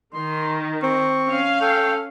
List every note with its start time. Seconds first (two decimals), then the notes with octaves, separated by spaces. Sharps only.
0.14 D#3 C6
0.83 C4 C#6
1.28 C#4 F5
1.61 A4 G5